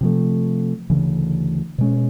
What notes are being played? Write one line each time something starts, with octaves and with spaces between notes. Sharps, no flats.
C3 F3 A3
D2 C#3 E3
B2 G#3 C#4